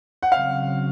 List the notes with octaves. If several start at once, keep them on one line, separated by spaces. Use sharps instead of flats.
F#5
C#3 F#3 C4 F5